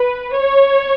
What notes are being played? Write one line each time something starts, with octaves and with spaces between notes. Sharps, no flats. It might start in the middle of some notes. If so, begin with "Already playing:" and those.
Already playing: B4
C#5